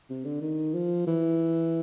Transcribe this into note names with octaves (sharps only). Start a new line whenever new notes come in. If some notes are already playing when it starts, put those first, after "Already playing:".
C3
D3
D#3
F3
E3